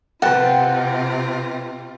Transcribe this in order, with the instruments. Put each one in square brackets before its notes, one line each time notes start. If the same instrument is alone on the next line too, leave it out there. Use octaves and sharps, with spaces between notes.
[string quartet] C3 F4 [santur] B4 G5 [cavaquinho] F#5 A5